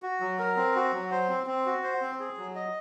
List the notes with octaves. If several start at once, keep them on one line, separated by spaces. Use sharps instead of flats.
F#4
F#3
A#4
C4
F#4
F#3
C5
C4
C4
F#4
C5
C4
G#4
F#3
D#5